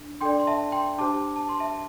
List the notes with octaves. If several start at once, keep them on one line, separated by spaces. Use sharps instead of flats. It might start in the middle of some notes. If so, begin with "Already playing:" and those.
Already playing: D4
D4 A4 D5 G5 C6
C6
E5 A5
G5 C6
D4 G4 C5 A5 D6
A5
C6
E5 A5